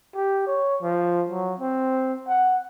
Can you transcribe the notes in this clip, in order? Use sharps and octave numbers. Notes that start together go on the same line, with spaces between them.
G4
C#5
F3
F#3
C4
F#5